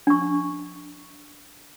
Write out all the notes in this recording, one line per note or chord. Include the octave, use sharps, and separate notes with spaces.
D4 C#6